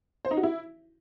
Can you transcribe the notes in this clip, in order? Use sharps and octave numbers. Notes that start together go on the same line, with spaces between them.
C5
D#4
F#4
E4